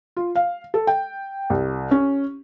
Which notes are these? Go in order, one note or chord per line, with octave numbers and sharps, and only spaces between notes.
F4
F5
A4
G5
C2
C#4